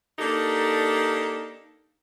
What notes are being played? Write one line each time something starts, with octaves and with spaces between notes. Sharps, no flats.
A#3 D4 D#4 G4 A4